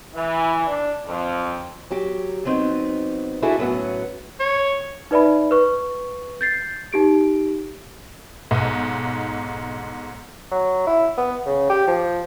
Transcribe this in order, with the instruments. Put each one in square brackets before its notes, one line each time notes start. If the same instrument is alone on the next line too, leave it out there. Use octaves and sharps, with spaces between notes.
[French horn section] E3
D4
F2
[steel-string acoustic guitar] F#3 G4
F#3 B3 C4 D#4
D4 E4 F#4 G#4 A4 E5
A2 F#3 A#3 B3 C#4 F#5
[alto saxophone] C#5
[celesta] D#4 B4 D5 E5 B5
B4 C#6
G6 A6 C7
D#4 G4 D7
[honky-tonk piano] B1 G#2
[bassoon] F#3
E4
B3
C#3
G4
F3